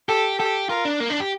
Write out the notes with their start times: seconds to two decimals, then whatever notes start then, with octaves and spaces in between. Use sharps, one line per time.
0.09 G4 A4
0.39 G4 A4
0.69 F4 A#4
0.85 D4
1.00 A#3
1.10 D4
1.20 G4